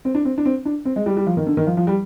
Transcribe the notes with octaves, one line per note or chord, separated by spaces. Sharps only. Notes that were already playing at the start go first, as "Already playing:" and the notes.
C4
D4
C4
D4
C4
D4
C4
G#3
G3
G3
F3
D#3
D3
D#3
F3
F3
G3